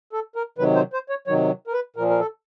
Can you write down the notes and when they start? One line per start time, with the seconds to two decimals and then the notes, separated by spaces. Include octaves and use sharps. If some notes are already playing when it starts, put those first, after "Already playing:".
0.13 A4
0.36 A#4
0.58 C3 D#3 F#3 B4
0.75 C5
0.93 C5
1.09 C#5
1.27 C3 D#3 F#3 C#5
1.67 A#4
1.73 B4
1.96 A#2 F3 A#4
2.10 A#4
2.20 A4